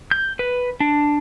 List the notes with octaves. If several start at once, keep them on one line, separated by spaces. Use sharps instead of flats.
G6
B4
D4